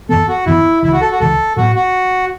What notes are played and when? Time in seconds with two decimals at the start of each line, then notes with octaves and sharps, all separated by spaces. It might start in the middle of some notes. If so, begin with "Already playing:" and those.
0.09 F#2 E3 B3 A4
0.28 F#4
0.46 F#2 E3 B3 E4
0.82 C#2 C#3 E3 E4
0.93 F#4
1.01 A4
1.11 F#4
1.20 C#2 C#3 E3 A4
1.57 A2 F#3 B3 F#4
1.76 F#4